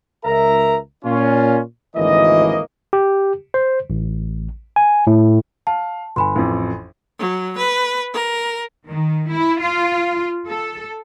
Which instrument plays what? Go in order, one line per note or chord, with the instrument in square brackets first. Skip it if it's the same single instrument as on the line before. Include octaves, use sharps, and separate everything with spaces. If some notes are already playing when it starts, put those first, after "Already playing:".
[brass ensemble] C#2 A#4 E5 A#5
A#2 C#4 F4
G#1 D2 E3 A#3 D#5
[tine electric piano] G4
C5
A1
G#5
A2
[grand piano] F5 [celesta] A5
[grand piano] G1 [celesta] G#5 B5 C6
[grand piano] A1 F2
[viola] F#3
B4
A#4
[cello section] D#3
E4
F4
A4